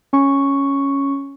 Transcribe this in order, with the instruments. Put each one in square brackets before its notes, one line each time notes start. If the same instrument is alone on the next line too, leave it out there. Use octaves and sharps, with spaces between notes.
[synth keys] C#4 C#6